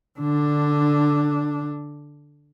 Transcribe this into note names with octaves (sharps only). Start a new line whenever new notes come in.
D3 D4